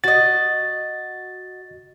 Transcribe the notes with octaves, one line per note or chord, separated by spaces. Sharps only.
F#4 D#5 A6